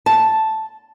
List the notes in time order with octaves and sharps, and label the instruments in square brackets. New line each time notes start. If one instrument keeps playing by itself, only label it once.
[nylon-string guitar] A5